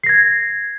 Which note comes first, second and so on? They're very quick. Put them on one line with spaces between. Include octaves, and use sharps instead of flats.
C7 A#6 G#6